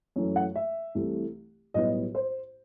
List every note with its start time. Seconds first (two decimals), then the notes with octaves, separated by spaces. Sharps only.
0.16 F#2 E3 A3
0.36 F#5
0.55 E5
0.95 C2 C3 E3 A3
1.74 B1 A2 G3 B3 D#5
2.15 C5